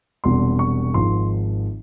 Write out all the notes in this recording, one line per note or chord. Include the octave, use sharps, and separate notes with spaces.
E1 E2 C3 G3 C6
C#6
G#1 G#2 F3 C6